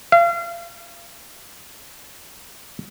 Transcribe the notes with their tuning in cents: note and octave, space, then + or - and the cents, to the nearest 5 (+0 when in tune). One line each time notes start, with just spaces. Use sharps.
F5 -35